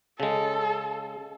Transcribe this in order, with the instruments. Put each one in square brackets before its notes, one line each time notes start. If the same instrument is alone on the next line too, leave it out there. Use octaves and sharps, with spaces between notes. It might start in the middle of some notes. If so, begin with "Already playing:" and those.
[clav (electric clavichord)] C#3 G#3 [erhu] A4